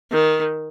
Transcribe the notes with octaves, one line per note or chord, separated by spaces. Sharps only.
D#3